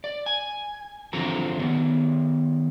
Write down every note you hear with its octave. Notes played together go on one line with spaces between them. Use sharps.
D5
G#5
D3 E3 F3 C4 F#4 A#5
D#3 B3